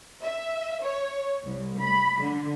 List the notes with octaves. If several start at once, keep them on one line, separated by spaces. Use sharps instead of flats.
E5
C#5
C2
B5
D3